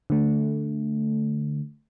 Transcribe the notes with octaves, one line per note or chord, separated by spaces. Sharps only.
D3 A3